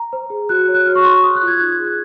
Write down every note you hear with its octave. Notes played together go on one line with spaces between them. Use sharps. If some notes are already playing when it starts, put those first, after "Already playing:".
Already playing: A#5
C5
G#4
F#4 F#6
C#5
F#6
F#4 F6
C#6
C5 C6
C#6
G#4 D#6
F#6
F4
G#6
D#4 F#6
G#6
G#4
F#6